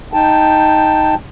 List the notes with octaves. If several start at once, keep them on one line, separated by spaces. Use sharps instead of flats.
D#4 G5 A5